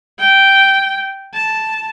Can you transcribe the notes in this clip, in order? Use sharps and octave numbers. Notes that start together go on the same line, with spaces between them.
G5
A5